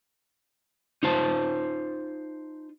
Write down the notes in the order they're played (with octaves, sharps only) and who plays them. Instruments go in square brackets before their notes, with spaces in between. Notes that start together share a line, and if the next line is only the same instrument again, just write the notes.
[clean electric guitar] D#4 F4 C5 A5